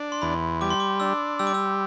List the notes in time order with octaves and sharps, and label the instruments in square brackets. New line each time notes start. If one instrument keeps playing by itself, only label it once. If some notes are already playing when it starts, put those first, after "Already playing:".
Already playing: [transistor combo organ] D4
[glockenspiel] C6
[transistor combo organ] E2 [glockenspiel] B5
[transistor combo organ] G3 [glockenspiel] D6
[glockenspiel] C6
D6
[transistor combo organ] D4 [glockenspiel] E6
[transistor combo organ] G3 [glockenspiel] E6
[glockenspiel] D6
E6